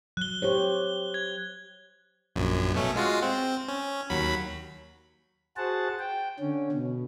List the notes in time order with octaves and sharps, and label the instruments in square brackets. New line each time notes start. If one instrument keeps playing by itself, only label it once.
[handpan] F#3 [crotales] F#6 G7
[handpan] G4 C5 C#5
[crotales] G#6
[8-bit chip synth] A#1 F#2
B2 A3 C#4
G#3 F4 F#4
C4
C#4
D#2 F#3 B5
[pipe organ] F#4 G#4 C5 F#5 A5
G5
D3 C#4
B2